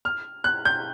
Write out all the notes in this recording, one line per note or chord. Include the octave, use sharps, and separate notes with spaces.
F6
F#6
G6